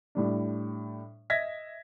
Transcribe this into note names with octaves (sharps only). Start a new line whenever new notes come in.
A2 G3 D4
D#5 E5 G#6 A#6 B6